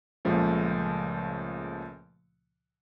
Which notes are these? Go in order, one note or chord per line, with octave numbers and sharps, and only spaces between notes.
C#2 A#2 C#3 F3 A3